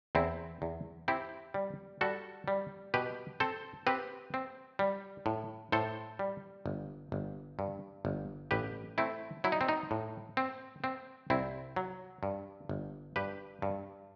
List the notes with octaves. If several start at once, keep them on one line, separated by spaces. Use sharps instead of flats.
E2 C4 E4
E2
C4 E4 G4
G3
G3 F#4 A4
G3
B2 G4 B4
C4 A4 C5
C4 G4 B4
C4
G3
A2
A2 A4 C5
G3
G1
G1
G2
G1
A1 G4 B4
A3 C4 E4
F#3 E4
D#4
C4
D#4
A2
C4
C4
C2 C4 E4
F#3
G2
G1
G2 G4 B4
G2